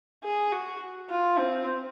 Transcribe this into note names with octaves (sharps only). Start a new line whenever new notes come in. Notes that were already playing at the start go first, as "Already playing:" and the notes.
G#4
F#4
F4
C4